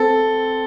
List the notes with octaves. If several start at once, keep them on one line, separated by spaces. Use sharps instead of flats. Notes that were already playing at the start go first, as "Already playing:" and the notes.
Already playing: C4 A4